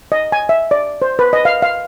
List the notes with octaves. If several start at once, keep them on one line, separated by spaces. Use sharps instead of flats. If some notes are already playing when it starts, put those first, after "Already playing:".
D#5
G#5
E5
D5
C5
B4
D#5
F5
F5